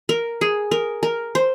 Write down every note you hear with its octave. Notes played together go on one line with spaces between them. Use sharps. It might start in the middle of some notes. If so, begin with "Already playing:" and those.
A#4
G#4
A#4
A#4
C5